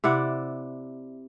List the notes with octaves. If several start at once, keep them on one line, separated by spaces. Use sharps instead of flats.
C3 E4 D5 F#5